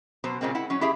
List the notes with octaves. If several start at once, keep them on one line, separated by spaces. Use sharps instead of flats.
B2 F#3 C5
A#2 C#3 G#3 A#3 C4
E4 F#5
F#3 C#4
E4 G4 G#4 E5